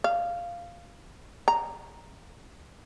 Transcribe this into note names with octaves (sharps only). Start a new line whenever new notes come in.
F5
A#5